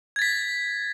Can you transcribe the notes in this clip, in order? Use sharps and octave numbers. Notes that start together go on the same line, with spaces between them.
G#6 A6 B6